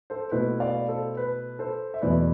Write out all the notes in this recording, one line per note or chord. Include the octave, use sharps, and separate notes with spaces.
A4 C5
B2 A3 E4 B4
D5 F5
A4 C5
B4
A4 C5
E5
E2 B2 A3 E4 B4 D5